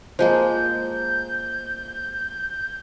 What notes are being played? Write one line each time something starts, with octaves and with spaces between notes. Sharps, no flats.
F3 G#3 A#3 C5 G6